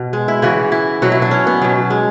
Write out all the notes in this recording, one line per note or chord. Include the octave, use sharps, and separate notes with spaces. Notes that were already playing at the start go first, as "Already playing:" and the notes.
Already playing: B2
G#3
E4
C#3 E3 F#4
E4
B2 F#3 F#4
E4
D4
C#4
B3
B2 F#3
G#3